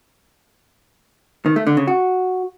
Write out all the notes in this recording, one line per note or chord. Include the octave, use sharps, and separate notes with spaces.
D#3
A3
D3
C#3
F#4